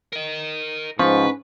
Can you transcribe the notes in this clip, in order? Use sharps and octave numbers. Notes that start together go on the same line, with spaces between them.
A#4 D#5
G#2 F3 C#4 B4 C#6